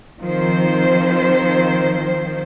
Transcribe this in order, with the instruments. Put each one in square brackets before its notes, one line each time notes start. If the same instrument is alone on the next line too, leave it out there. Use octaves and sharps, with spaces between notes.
[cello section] D#3 F3 C4 C5